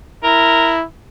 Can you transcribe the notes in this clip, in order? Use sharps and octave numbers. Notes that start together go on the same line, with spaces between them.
E4 A#4